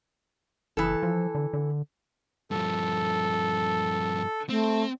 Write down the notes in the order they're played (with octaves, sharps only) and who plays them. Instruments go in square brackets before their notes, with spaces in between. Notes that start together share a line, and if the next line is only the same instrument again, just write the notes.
[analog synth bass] F#1 [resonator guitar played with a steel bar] E3 A4
[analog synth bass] F3
D3
D3
[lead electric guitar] G2 F3 [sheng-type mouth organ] A4
[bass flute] A3 [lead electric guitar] C4